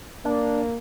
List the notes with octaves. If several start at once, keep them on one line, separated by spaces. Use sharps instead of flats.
A#3 D4